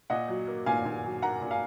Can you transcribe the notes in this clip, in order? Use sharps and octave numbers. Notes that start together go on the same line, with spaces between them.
A#2 D#5 F#5
F#3
A#3
A#2 F5 G#5
A#2
F#3
A#3 F#5 A#5
A#2
F5 G#5